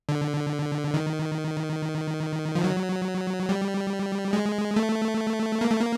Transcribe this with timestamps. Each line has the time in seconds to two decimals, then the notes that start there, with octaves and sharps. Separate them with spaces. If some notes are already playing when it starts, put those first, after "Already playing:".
0.09 D3
0.94 D#3
2.55 F3
2.64 F#3
3.49 G3
4.33 G#3
4.76 A3
5.61 A#3
5.71 A3
5.80 A#3